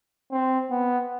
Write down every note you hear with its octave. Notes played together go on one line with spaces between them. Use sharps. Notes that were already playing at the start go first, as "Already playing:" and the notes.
C4
B3